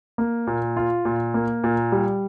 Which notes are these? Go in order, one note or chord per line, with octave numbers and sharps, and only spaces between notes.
A#3
A#2
F4
A#2
A#3
A#2
G3